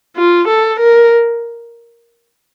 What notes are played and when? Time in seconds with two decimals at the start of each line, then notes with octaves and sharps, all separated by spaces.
0.16 F4
0.48 A4
0.80 A#4